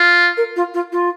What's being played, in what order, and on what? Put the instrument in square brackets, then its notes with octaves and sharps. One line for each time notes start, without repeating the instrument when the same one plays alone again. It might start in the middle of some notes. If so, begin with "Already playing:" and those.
Already playing: [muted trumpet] F4
[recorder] A#4
F4
F4
F4